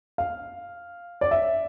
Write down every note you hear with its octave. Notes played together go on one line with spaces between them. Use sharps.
F5
D5
E5